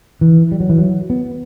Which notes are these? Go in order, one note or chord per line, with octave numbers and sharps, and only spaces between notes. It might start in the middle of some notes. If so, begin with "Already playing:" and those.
E3
G3
F#3
E3
F#3
B3